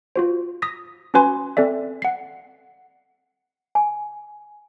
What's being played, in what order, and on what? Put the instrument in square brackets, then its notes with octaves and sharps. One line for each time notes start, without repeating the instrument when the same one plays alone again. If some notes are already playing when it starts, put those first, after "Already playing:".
[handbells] F4 F#4 C5
D#6 A#6 B6
C#4 F#4 B4 G#5 C6
C4 A4 D5 E5
F#5 C7
[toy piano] G#5